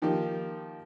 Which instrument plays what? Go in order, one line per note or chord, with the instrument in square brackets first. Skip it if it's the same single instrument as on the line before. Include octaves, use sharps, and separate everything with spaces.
[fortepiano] D#3 F3 A#3 D#4 G4